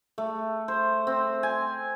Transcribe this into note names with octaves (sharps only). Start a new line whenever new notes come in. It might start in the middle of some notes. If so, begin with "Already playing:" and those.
A3
C5
C4
G#5